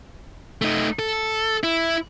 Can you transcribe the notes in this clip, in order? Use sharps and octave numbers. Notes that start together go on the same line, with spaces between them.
A3 D#4
A4
E4